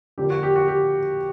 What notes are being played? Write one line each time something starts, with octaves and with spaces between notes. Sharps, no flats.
D3 F3 A#3 G4
F#4
G4
F#4
G4